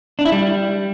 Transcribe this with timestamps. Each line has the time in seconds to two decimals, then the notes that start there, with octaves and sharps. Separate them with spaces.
0.19 D4
0.25 E4
0.32 G3